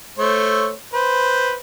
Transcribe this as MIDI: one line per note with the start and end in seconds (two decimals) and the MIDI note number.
0.18 0.72 57
0.18 0.72 72
0.18 0.72 73
0.93 1.56 71
0.93 1.56 72